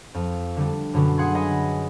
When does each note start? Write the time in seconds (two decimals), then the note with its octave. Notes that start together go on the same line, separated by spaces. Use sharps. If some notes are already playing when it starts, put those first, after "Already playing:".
0.14 F2
0.57 D3 G3
0.94 F#2 B2 D3 F#3
1.18 G#4 F#5 C6 G#6
1.35 B4 D#5 F#5 G#5